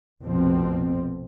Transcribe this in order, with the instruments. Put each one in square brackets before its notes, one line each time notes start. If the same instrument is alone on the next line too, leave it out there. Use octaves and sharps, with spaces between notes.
[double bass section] F1 A#1 F2 B2 F3 C4